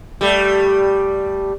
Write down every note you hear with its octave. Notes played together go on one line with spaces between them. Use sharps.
G3 A3